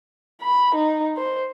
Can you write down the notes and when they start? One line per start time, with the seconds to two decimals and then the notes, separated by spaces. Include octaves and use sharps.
0.41 B5
0.75 D#4
1.17 C5